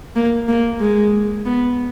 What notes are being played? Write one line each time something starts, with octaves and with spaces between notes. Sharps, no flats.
A#3
A#3
G#3
B3